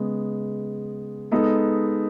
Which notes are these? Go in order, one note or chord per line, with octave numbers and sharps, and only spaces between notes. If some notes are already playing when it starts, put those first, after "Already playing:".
Already playing: C#3 G#3 B3
G#3 B3 D#4 A4